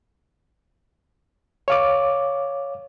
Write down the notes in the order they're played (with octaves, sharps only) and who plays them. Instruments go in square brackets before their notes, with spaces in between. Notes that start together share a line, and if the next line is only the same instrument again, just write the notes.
[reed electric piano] C#5 F5 D6